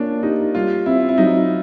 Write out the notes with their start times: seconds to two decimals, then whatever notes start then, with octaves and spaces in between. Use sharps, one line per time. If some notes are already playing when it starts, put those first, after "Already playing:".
Already playing: A#3 C#4 D4 F4
0.23 D#4 G4
0.55 G3 F4
0.86 C4 E4
1.09 E4
1.18 F#3 D#4